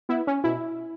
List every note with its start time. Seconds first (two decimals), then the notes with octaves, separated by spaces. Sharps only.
0.09 B3 E4
0.27 C#4
0.44 B2 E4